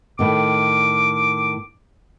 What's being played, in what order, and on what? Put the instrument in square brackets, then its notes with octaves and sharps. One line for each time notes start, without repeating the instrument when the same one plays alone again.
[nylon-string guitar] A2 D#3 [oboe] D6